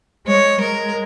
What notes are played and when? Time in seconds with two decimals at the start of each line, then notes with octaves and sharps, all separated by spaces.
0.27 G#3 C#5
0.60 G#3 A#4